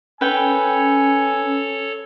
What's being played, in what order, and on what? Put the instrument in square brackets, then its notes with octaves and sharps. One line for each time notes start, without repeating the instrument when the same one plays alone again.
[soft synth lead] C#4 [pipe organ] A4 C#5 [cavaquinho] B4 G5 [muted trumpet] G#5